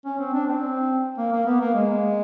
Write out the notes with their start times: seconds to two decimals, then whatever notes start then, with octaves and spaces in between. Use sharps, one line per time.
0.05 C#4
0.19 C4
0.33 D4
0.47 C4
1.18 A#3
1.32 A#3
1.46 B3
1.60 A#3
1.74 G#3